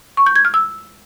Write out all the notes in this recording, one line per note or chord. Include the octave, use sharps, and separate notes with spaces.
C#6
G6
G#6
F6
E6